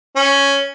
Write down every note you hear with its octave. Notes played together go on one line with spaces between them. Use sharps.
C#4